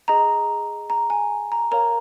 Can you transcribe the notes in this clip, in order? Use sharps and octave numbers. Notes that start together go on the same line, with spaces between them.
G#4 D#5 A#5
A#5
G#5
A#5
A#4 C#5 F5 A#5